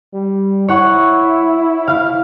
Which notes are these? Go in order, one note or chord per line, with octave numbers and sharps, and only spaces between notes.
G3
E4 C#5 F#5 C#6
F5 F6